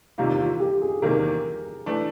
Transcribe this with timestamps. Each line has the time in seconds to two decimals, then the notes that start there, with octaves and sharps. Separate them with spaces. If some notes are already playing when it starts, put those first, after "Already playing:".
0.18 E2 C3 D#3 G3 A#3 F4
0.39 F4
0.60 G4
0.82 G#4
1.02 E2 C3 D#3 G3 A#3 A#4
1.86 E3 A3 D4